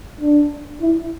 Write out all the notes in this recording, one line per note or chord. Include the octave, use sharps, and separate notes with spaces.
D4
E4